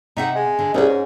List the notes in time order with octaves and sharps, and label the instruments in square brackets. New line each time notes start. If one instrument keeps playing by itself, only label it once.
[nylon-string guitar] C3 E5 F#5 [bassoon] D#4
[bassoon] G#3
[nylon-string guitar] D3
[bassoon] C2 [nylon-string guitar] C#4 G#4
[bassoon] G#2